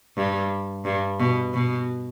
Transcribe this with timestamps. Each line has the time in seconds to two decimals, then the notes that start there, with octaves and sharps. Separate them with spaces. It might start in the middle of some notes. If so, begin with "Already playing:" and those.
0.17 G2
0.85 G2
1.19 B2
1.53 B2